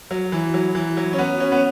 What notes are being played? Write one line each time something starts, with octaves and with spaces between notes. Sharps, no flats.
F#3
E3
F#3
E3
F#3
C#4
B3
C#4
B3